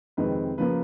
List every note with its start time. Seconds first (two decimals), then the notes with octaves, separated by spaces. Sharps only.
0.17 F2 C3 D#3 G#3 C4 B4
0.58 C#3 F3 A#3 B4